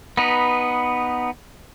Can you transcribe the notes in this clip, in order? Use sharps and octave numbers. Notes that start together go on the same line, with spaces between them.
B3 D#4 B4